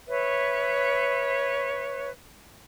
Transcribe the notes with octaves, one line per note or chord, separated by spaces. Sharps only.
B4 C#5 E5